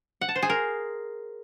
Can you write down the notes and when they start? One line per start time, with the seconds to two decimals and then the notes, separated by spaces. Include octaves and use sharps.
0.21 F#5
0.28 A5
0.35 C5
0.42 G#4
0.49 A#4